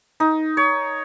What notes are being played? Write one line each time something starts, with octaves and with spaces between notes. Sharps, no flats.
D#4
C#5